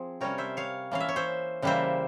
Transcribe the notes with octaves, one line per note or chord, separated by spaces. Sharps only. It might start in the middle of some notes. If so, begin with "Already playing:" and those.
Already playing: F3 C4 G#4
C3 G3 C#4 A#4 C#5
C5 E5
C#5 F5
E3 A#3 C#4 F5
E5
C#5
C5 E5
C#3 E3 G3 A#3 C5 E5